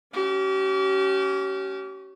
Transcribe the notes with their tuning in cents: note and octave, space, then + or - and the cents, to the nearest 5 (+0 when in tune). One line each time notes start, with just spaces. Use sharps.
C#4 +5 G4 -40